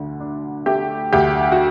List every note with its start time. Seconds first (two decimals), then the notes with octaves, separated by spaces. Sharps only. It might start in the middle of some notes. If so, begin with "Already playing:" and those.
Already playing: D2 D3
0.20 D4
0.66 A3 G4
1.13 D2 G4
1.52 F#4